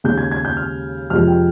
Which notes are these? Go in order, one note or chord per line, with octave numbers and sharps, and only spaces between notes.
D#2 C#3 G#3 G6
G#6
G#6
G6
F6
F2 C3 F3 G#3 F6
G5